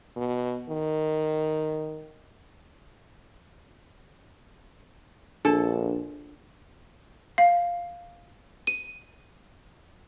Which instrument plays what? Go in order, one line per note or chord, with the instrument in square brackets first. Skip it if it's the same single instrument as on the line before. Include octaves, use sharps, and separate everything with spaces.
[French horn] B2
D#3
[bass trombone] A#1 [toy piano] D4 [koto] A4
[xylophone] F5
D#7